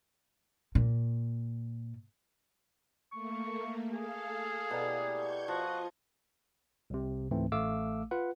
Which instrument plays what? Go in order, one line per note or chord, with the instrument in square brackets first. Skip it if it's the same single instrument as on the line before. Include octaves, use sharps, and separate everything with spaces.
[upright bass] A#2
[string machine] A3 A#3 [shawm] C#6
[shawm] G#4 [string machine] A4 F5
[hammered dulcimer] B2 A#5 [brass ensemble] E4 G4 D5
[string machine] C#6 G6 G#6
[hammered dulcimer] F3 [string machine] F4 D#5 [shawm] F#4
[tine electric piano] C2 C3
C#2 G#2 E3 A3 C4
A1 A3 F5 D6 E6
F4 B4 F#5